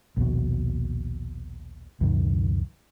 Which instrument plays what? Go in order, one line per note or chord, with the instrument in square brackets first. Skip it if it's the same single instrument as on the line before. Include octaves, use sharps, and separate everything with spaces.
[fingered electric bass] A#1 D#2 B2
C#2 F#2 B2 D#3